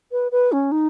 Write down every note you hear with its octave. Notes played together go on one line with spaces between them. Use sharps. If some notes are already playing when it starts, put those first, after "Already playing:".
B4
B4
C#4
D#4